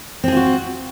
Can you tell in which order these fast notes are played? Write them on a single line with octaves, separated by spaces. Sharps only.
C4 G#4 F4 F#4